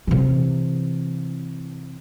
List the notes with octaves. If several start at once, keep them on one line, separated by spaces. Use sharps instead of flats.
C3 E3